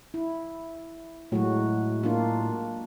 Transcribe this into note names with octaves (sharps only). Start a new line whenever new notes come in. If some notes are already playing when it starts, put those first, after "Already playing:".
E4
A2 F#3 G#3 F#4
A#3 D4 F4